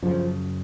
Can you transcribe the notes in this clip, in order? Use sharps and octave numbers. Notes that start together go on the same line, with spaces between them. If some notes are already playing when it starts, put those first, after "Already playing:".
F#2 C#3 F3